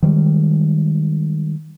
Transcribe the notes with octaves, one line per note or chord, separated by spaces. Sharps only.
D#3 F3 G3 G#3